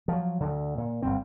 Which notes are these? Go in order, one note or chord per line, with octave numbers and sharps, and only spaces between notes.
F3 F#3
D2 D3
A#2
G1 G2 C4